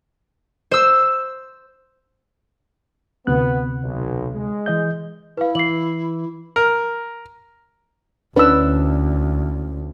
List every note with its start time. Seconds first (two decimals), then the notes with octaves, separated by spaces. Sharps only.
0.71 C5 E6
3.27 D2 C3 B3 F#6
3.83 B1
4.34 G#3
4.66 E3 D#5 G6
5.37 E4 B4 F5
5.55 E3 C7 F#7
6.56 A#4
8.36 D2 C#4 D4 E4 B4 E6